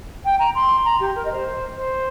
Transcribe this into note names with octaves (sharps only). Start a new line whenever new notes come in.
G5
A#5
C6
A#5
G4
A#4
D#5
C5
C5